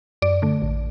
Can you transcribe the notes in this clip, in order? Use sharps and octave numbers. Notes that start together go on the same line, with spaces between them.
F#2 D5
D3 A3
A1